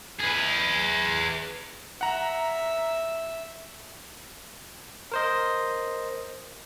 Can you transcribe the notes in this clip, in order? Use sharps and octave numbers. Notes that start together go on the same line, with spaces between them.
G#4 B4
E5 F#5 A#5
A#4 C5 D#5